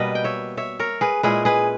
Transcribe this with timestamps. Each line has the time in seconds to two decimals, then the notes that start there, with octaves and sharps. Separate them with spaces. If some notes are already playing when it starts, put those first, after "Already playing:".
Already playing: B2 G3 A#3 B4 D#5
0.15 G5
0.24 C#5 E5
0.57 C#5 E5
0.79 A#4 C#5
1.01 G#4 B4
1.23 A#2 G#3 C#4 E4 G#4 B4
1.45 G#4 B4